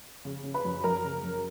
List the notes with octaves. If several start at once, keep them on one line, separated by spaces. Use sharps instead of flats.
C#3
C#3
B4 B5
F#2
F#2 A#4 A#5
C#3
F#2